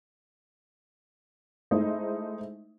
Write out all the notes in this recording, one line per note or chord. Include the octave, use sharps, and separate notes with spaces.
G#3 A3 D#4 E4 C5 D#5